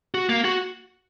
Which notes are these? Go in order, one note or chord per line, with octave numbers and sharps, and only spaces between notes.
F#4
A#3
F#4